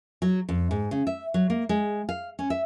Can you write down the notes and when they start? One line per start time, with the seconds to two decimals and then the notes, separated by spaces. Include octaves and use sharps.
0.22 F#3
0.49 F2
0.71 G#2
0.91 C#3
1.07 E5
1.34 F#3
1.50 A#3
1.69 G#3
2.09 F5
2.39 C#4
2.50 E5